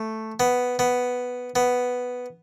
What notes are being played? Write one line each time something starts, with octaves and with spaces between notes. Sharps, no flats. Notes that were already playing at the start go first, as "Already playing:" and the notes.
Already playing: A3
B3
B3
B3